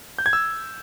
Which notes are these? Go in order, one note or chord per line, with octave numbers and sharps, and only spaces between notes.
G6
G#6
E6